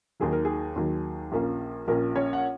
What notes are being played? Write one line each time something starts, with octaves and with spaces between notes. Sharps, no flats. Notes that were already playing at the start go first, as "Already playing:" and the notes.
D#2 D#3 F#3 G#4
A#4
G#4
D#2 D#3 F#3
A#1 A#2 A#3 C#4
A#1 A#2 A#3 C#4 A#4
C#4 C#5
F#5